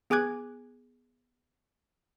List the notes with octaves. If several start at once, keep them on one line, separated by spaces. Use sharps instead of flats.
B3 G#4 G#5 D6 F#6 G#6